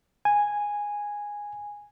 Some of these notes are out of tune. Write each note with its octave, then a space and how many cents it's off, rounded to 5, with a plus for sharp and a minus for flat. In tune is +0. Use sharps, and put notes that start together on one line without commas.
G#5 -10